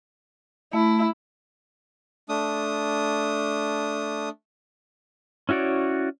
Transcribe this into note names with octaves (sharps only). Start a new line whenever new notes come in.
A3 E4
A3 D4 D#6
C#4 E4 F#4 C#5 D5